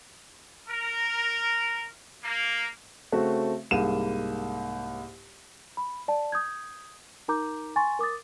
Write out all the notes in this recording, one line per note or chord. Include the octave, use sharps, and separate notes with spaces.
A#4
A#3
C#3 A3 C4 F#4
C2 G#2 A#3 D#7 E7
B5
D5 A5
D#6 G6 G#6
D#4 A#4 A#5 D6 G6
G#5 C6 C#6 A6
A#4 D6 D#6 A6